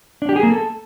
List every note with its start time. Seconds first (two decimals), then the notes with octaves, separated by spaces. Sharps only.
0.22 D4
0.29 G4
0.36 G#4
0.43 A#3
0.50 A4